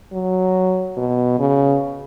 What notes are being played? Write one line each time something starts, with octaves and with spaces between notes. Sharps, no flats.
F#3
B2
C#3